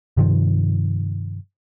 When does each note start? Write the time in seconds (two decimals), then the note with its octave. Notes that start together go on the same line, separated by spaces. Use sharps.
0.17 G2 C3 D#3 F3